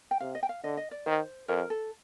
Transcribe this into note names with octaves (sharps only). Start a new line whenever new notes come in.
G5
C3 F5
D#5
G5
F5
D3 D#5
D#5
D5
D#3 C5
F2 A#4
A4